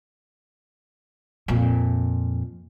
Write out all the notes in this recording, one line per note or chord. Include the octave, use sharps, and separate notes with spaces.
F2 A#2